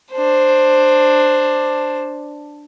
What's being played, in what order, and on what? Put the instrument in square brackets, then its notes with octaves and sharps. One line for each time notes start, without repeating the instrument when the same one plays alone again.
[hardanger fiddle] D4 C5